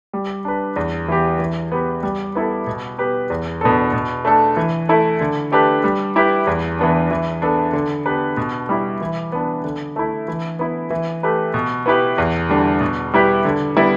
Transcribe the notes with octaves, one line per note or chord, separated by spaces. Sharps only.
G3
D4 B4
E2
E3 B3 G4
E3
B3 G4 B4
G3
B3 E4 A4
B2
B3 G4 B4
E2
B2 B3 D4 A4
B2
A3 D4 A4
E3
A3 E4 A4
D3
A3 D4 G4 B4
G3
E4 G4 B4
E2
E3 B3 D4
E3
B3 D4 A4
D3
B3 D4 G4 B4
B2
G3 E4
E3
B3 D4
D3
A3 E4
E3
B3 E4
E3
A3 G4 B4
B2
B3 E4 G4 B4
E2
D3 G3 D4
B2
G3 E4 G4 B4
D3
G3 B3 E4